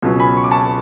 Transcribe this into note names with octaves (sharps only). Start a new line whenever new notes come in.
C#2 B2 F#3 C#4
G#5 B5
C#6
D6
A5 C#6